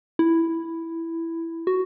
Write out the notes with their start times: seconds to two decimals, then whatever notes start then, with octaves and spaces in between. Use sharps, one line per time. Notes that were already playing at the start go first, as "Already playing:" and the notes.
0.19 E4
1.67 F#4